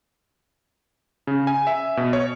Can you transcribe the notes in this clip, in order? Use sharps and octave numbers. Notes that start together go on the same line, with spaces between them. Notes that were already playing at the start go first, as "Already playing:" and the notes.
C#3
G#5
E5
B2
C#5